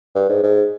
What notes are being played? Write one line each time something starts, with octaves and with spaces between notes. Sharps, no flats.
G2
G#2
G#2